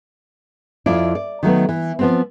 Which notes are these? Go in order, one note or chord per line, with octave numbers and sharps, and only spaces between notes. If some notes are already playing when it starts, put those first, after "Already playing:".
F2 E4 F4 D5
D5
D#3 F#3 A3 B3
E3
F3 B3 C4